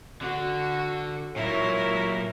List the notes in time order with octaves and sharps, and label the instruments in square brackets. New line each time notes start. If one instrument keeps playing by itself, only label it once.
[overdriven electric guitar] D3 [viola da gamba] F#4
[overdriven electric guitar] A#2 F#3 [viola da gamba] E4 A#4 [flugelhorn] C#5